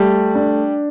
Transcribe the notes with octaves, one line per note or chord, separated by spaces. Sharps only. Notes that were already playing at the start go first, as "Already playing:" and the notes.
Already playing: G3 A3
D4